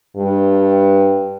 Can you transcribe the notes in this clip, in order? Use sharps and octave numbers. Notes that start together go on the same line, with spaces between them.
G2